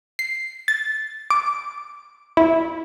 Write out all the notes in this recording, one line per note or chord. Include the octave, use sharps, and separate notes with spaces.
C7
A6
D6
E4